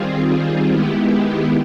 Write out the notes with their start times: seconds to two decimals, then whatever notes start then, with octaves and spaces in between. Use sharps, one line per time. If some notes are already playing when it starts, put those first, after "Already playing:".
Already playing: D#3 G3 C4 F4 G#4
0.72 D#3 G#3 B3 E4 G4